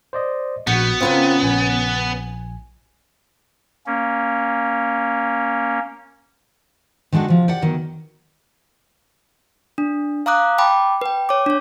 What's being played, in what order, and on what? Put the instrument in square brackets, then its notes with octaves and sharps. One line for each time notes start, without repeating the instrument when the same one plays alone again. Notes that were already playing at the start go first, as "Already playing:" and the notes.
[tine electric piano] C5 D5 D#5
[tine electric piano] A#1 G6 C#7 [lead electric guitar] B3 [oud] F#4
[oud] C#3 C#4 A#4 [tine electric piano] C4 F4 B4
[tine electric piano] A#1 G#5
[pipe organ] A#3 C#4
[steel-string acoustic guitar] D#3 G#3 D4 F#4 A4
C3 F3
G4 D5 F#5
E2 D#3 F#3
[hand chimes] D4
F5 A#5 D6 D#6 F#6
G5 A5 B5 D6
B4 G5
C#5 D6
D4 C#5